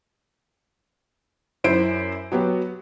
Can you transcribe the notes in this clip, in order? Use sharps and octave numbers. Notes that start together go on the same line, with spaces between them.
F#2 E4 C5 D7
F#3 B3 F#4 G4